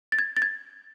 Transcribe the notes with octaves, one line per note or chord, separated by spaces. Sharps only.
A6
G#6
A6
G#6